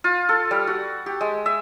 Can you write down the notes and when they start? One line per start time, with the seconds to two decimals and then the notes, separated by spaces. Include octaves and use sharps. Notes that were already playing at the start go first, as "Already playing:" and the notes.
0.04 F4
0.29 A4
0.51 G3
0.67 F#4
1.06 G4
1.21 G#3
1.46 E5